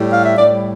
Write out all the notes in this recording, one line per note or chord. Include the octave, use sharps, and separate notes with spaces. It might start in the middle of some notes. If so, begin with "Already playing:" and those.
Already playing: A2 G3
F5
E5
A2 D5
G3